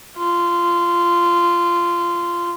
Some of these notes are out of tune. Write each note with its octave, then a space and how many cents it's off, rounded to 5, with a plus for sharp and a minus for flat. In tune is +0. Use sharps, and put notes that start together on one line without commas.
F4 -15